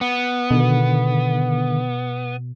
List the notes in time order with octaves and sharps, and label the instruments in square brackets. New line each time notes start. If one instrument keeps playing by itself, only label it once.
[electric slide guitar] B3
[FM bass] B2 [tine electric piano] D3 D#3